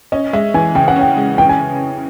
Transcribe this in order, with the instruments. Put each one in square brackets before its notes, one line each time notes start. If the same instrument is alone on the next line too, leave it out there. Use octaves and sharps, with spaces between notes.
[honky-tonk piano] C#4 [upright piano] D#5
[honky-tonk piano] G#3 [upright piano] E5
[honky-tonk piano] E3 [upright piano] G#5
[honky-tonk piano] C#3 [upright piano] G5
[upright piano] F#5
[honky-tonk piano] C#4
[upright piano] G5
[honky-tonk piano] G#3
[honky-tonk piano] E3 [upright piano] G5
[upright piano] G#5